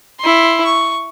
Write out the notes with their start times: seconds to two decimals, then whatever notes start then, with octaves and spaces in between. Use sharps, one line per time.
0.20 E4 C6
0.65 C#6